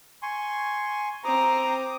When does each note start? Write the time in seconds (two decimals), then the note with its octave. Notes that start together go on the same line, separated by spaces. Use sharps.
0.22 G#5 C6 C#6
1.25 C4 A#5 D6 D#6